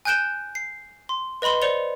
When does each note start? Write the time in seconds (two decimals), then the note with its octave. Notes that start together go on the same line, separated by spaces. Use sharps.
0.05 G#5 F#6 G6 D7 E7 G7
0.55 C7
1.09 C6
1.42 B4 D#5 B5 C6 G7
1.62 C5 D5 C#7 F7 G7